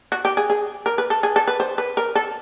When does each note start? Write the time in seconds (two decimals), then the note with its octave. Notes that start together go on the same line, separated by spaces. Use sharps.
0.12 F#4
0.25 G4
0.37 G#4
0.50 G#4
0.86 A#4
0.98 B4
1.10 A4
1.23 G#4
1.36 A4
1.48 B4
1.60 C5
1.78 B4
1.97 A#4
2.15 A4